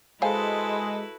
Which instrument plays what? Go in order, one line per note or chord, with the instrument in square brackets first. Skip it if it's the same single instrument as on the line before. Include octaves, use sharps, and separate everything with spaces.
[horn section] G#3 [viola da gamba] E4 F#4 B4 [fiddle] A4 [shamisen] C5 F5 G#5